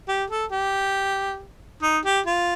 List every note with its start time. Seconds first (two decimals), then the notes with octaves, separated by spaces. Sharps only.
0.09 G4
0.30 A4
0.52 G4
1.83 D#4
2.05 G4
2.26 F4